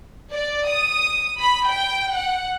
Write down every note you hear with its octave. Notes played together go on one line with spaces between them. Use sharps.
D5
D#6
B5
G5
F#5